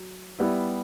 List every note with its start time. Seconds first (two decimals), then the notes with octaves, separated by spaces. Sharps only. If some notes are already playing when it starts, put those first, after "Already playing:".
Already playing: F#3
0.39 G3 B3 E4